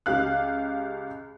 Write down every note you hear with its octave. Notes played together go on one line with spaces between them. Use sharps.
C#2 G4 F5 F#6